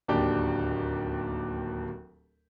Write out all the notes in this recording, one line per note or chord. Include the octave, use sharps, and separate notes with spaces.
D1 D#2 D4 G4 G5